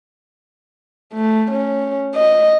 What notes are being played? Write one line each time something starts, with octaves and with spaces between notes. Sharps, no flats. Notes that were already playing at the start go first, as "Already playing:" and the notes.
A3
C#4
D#5